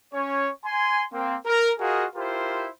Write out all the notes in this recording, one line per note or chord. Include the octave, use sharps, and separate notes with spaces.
C#4 C#5
G#5 C6
A#3 C4
A#4
F4 F#4 G#4 A#4 D#5 F5
E4 F4 G4 A#4 C5